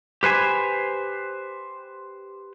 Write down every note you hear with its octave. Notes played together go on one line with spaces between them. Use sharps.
G4 B4 C5 G#5